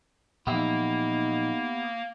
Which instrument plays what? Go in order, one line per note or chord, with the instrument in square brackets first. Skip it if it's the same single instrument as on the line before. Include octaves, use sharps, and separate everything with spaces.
[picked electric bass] A#2 F3 F#3 [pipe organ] A#3 [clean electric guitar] B3 G4 E5 [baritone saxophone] D#4